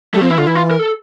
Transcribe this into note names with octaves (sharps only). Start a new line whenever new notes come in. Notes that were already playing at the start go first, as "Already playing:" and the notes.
G3 A3
F3 C4
E3 E4
D3 F4
E3 E4
F4
A#4
A4